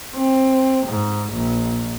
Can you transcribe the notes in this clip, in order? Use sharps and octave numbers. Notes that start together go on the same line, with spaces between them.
C4
G#2
A#1